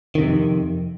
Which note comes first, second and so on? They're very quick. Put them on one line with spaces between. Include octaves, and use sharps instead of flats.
D#3 C3 F2